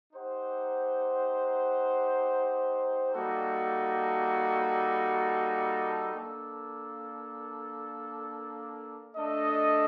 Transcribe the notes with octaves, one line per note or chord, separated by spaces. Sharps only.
D#4 G4 C5 F#5
G3 A#3 D#4 F#4 A4
A#3 D4 A4
A3 D4 A4 D#5